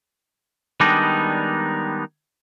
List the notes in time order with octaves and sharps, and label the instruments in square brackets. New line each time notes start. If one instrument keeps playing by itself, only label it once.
[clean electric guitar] D#3 G3 G#3 B3 D4 D#4